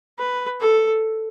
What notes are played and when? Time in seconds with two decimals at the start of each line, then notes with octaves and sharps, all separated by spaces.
0.19 B4
0.60 A4